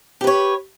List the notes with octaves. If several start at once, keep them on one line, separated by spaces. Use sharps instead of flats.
G4 B4 C#5